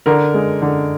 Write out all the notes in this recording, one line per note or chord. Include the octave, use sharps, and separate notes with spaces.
D3 A#4
G#3
D3